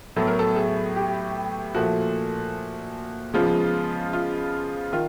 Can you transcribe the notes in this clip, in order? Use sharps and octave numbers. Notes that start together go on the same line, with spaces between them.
A2 F#3 B3 A4
A#4
A4
G#4
G4
A#2 F3 A3 F#4
C#3 F3 G#3 B3 F4
F4
D#3 F4